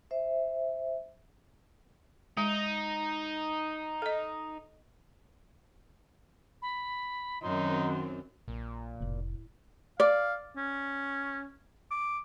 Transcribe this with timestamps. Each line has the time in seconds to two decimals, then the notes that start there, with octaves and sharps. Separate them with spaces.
0.11 C5 E5
2.37 G#3 D#4
4.02 A4 D#5
6.62 B5
7.42 F#2 D#3 F#3 C4 D#4 C6
8.48 A#1 A#2
9.01 F1 A2 E4
10.00 D5 F5
10.56 C#4
11.91 D6